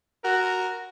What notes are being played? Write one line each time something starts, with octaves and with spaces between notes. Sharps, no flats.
F#4 A#4